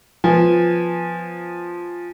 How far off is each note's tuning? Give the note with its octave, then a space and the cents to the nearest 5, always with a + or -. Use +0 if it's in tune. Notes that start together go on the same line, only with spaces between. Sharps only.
F3 +0 B3 +0 G#5 -15